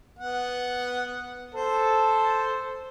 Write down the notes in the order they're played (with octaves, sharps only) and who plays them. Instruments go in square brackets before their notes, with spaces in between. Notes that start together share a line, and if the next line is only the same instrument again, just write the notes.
[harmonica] B3 F#5
[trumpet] A4 [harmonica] C5